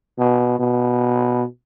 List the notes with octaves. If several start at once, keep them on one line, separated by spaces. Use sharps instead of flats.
B2
B2